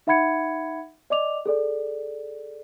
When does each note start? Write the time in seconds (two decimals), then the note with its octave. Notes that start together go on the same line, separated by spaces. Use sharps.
0.07 D#4 E5 F#5 B5 G#6 C#7
1.10 D5 D#5 D6 F7
1.46 G#4 A4 D5